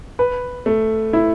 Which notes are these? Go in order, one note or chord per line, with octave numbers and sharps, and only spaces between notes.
B4
A3
E4